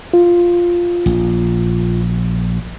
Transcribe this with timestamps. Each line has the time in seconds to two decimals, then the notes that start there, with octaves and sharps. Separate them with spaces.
0.14 F4
1.06 A#1